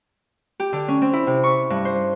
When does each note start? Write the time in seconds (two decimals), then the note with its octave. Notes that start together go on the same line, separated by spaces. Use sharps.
0.60 G4
0.73 D3
0.88 C#4
1.02 C4
1.13 E4
1.27 C3
1.44 C#6
1.70 G2
1.85 C5